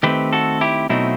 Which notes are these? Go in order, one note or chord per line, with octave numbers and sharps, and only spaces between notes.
D#3 A3 C4 G4 B4
F#4 A4
E4 G4
B2 F#3 A3 C4 D#4 E4